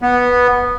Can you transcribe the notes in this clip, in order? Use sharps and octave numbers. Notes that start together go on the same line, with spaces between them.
B3